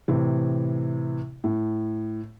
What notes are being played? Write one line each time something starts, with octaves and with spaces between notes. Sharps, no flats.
A2 C3 E3
A2